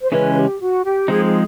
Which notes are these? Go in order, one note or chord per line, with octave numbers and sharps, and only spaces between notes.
C5
C#3 E3 G#3 C#4 B4
G#4
G4
F#4
G4
F3 G#3 C4 D#4 G#4
G#4